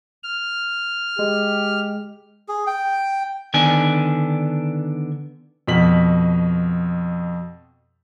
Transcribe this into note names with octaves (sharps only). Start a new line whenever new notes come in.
F6
G#3 G4
G#4
G5
D3 D#3 B3 D4 G#5
F2 B2 B6 F#7